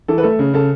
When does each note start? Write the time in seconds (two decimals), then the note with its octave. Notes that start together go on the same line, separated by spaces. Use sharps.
0.08 E3 A4
0.18 B4
0.23 A3 A4
0.39 C#3
0.54 C#3 A4